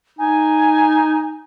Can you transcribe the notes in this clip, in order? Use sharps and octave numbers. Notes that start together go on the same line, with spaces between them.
D#4 G#5